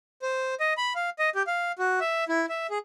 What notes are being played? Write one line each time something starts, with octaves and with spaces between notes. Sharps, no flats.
C5
D#5
B5
F5
D#5
G4
F5
F#4
E5
E4
E5
G#4